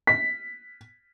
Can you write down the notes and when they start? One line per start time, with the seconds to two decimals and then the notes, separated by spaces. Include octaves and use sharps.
0.07 B6